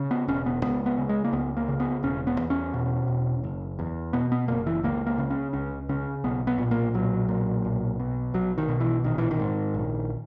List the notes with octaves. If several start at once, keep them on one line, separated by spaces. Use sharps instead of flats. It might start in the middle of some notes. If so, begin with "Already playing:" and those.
Already playing: C#3
B3
E1 C#4
B3
C#2 B3
B3
C#3
G#3
A#3
C#2 B3
A#3
C#3
B3
E1 C#4
B3
E2
C#4
B2
E1
F#1
E2
B2 B3
B3
F#1 A#3
E3
C#2 A#3
A#3
C#3
C#4
C#2 C#4
C#3 C#4
B1 B3
B3
A#2
A#3
B1 F#3
A#2
B1
B2
B1 F#3
D#3
B2
E3
A#1 D#3
E3
D#3
G#2
A#1